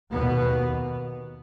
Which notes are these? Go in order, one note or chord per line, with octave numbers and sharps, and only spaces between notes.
D#2 B2 B3
D#2